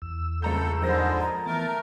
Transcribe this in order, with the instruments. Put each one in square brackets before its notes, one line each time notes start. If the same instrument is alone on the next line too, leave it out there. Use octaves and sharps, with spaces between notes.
[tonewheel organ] E2 E6
[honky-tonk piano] C#2 A#5 G6 [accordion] A3 A4
[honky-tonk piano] F2 A#4 A#6 [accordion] G#2 D3 G#3 [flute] C5
[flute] A#5
[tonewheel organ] E3 B3 A6 [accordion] A3 A#4